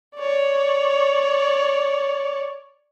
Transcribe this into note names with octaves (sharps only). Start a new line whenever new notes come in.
C#5 D5